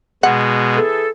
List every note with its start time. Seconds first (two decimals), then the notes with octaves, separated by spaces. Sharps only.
0.23 B2 G#3 F#5
0.76 E3 G#4 A4